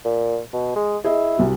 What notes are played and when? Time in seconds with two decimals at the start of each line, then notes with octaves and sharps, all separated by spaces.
0.05 A#2
0.53 B2
0.76 G#3
1.05 E4 G#4 D#5
1.38 C2 F#4